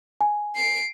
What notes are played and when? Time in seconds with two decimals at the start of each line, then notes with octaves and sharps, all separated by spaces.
0.21 G#5
0.56 C7 D7